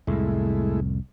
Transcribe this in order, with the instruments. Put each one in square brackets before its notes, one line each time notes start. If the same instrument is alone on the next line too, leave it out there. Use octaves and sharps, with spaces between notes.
[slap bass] C2 F2 A2 [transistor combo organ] G#3 A3 E4